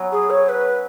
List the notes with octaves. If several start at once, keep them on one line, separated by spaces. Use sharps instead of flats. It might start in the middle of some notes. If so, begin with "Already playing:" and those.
Already playing: F#3 B3 C#4
G#4
C#5
B4